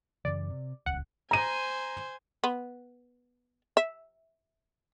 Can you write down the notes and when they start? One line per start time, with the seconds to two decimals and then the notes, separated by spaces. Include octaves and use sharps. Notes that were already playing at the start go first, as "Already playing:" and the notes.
0.25 F#2 C#3 E3 D5
0.50 C3
0.86 D#1 C#2 F#5
1.31 C5 G#5 A#5 D#7
2.44 B3
3.77 E5